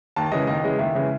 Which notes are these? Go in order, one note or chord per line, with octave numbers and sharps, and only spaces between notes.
D#2 A5
C#3 E3 G#3 D#5
D#2 D#5
C#3 E3 G#3
D#2 E5
C#3 E3 G#3